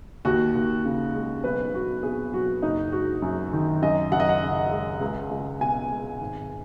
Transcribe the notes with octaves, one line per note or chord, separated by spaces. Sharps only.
D#2 F#4
D#2
C#3
G#3
B1 B4
B1 F#4
B2 G#4
F#3 F#4
F#1 D#4
G#3 F#4
F#2
D#3
F#2 D#5
F#2 F#5
D#5
F#5
C#3
G#3
C#2
C#2
B2 G#5
G#3
G#1